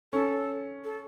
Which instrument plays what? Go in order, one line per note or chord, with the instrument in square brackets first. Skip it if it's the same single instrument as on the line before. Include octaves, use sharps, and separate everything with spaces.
[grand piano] C#4 [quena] A4
[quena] A4